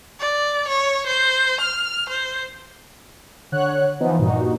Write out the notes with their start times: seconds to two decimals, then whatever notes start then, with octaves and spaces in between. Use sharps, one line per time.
0.20 D5
0.68 C#5
1.07 C5
1.61 F6
2.09 C5
3.52 D3 C#5 F#5 F#6
4.00 E3 F3 B3 D#4
4.19 G2 A#2 D#4 F#4